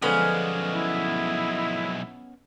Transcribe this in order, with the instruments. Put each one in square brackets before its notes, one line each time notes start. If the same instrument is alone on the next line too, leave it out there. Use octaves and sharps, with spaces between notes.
[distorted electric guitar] B1 G#3 [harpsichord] D3 F3 D4 [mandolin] B3 C#4 G#4
[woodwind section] E4